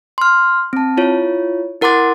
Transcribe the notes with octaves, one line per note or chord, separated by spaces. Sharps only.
C6 F6
C4 A5
E4 F4 C#5
E4 A#4 F#5 C6 D6 A6